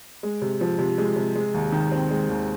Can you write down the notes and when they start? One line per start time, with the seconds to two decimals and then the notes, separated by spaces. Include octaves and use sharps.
0.23 G#3
0.42 C3
0.61 F3
0.78 C3
0.98 G#3
1.16 C3
1.35 G#3
1.54 D#2
1.72 D#3
1.92 C4
2.11 G#3
2.29 D#2